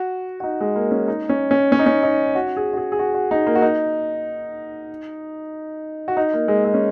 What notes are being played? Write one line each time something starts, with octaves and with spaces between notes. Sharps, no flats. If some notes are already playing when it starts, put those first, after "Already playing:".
Already playing: F#4
F#4
D#4
G#3
A#3
C#4
D#4
C#4
C#4
C#4
D#4
C#4
D#4
F#4
G#4
F#4
G#4
G#4
F#4
F#4
D#4
A#3
F#4
D#4
F#4
D#4
A#3
G#3
G#3
C#4